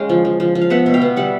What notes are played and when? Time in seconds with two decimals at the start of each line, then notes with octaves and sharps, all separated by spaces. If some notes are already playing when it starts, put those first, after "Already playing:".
Already playing: G#3 C#4 F5 G5
0.09 F3
0.25 F3
0.40 F3
0.55 F3
0.61 F5
0.70 B3 E5 F#5
0.86 B2
0.94 F5 G5
1.02 B3
1.17 G3 E5 F#5